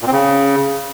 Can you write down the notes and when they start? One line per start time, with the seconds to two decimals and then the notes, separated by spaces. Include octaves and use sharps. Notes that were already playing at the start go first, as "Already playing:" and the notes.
0.02 A#2
0.07 C4
0.12 C#3